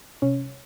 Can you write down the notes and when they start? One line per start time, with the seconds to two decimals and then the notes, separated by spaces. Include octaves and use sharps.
0.22 C2 C#4